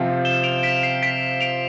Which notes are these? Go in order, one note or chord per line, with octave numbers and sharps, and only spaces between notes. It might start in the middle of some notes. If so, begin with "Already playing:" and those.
Already playing: C3 F3 C4 F4
E7 G7
D7 F7
B6 D7
C7
B6 D7
D7 F7